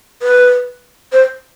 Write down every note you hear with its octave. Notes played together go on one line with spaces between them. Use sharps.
B4
C5